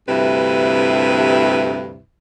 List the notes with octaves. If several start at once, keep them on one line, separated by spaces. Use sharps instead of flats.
D2 G2 C3 E4 B4